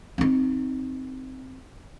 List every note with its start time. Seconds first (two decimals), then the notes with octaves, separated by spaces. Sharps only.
0.18 C4 D#4